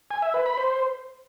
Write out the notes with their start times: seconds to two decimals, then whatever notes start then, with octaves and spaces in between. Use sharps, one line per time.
0.11 G#5
0.22 E5
0.34 B4
0.46 B5
0.58 C5